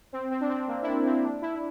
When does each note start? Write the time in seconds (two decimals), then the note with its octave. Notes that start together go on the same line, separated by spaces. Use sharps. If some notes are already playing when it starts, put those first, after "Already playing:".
0.13 C4
0.31 C4
0.41 D4
0.49 C4
0.68 A#3
0.82 E4
0.86 D4
1.05 C4
1.24 D4
1.42 E4
1.55 E4